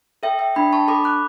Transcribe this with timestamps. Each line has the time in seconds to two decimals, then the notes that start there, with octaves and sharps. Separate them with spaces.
0.23 A4 E5 G5
0.39 E5 G5
0.55 D4 G5 B5
0.73 A5 C#6
0.88 A4 B5 D6
1.04 D6 F#6